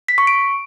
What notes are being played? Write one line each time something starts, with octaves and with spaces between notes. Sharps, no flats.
B6
C#6
D7